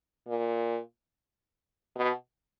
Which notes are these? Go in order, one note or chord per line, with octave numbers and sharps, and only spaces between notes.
A#2
B2